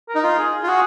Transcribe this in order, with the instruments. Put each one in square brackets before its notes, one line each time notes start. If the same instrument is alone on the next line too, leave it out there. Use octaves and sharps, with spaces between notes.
[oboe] A#4
[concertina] D#4
F4
[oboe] G#4
[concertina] F4
[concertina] F#4 [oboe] G#4